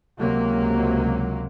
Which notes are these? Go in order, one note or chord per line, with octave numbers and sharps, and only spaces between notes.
C#2 C3 F#3 A#3